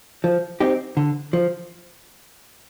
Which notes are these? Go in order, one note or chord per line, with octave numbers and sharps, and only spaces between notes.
F3
C4 D#4 G4
D3
F3